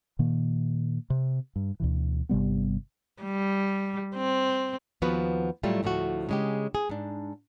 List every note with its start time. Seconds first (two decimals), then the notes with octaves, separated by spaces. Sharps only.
0.19 A#2 D#3 A#3
1.10 C3
1.56 G2
1.80 D2 B2 E3
2.29 G1 C3 G3 B3
3.22 G3
4.15 C4
5.02 D#2 F3 B3 F#4 B4
5.63 A2 F#3 G3 A3 F4
5.83 D2 A2 F3 A3 F#4
6.29 C#3 G#3 G4
6.75 G#4
6.89 G#2 D4